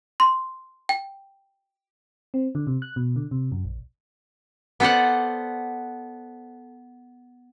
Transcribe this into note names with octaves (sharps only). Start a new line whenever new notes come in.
C6
G5
C4
D3
C3
F#6
B2
D3
C3
F#2
A#1
B3 A4 C5 D5 F#5